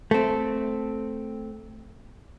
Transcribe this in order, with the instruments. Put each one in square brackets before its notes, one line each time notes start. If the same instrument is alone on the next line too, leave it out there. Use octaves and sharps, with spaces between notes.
[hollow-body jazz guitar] A3 C4